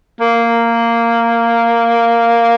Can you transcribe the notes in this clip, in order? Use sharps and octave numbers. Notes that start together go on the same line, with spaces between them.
A#3